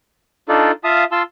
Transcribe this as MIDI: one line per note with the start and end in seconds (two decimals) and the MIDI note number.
0.49 0.71 62
0.49 0.71 63
0.49 0.71 65
0.49 0.71 69
0.49 0.71 74
0.84 1.04 65
0.84 1.04 76
0.84 1.04 77
0.84 1.04 81
0.84 1.04 87
1.12 1.23 65
1.12 1.23 81
1.12 1.23 84
1.12 1.23 88